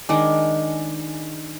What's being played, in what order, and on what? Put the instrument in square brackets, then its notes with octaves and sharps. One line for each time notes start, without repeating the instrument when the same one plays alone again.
[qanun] D#3 G#3 D4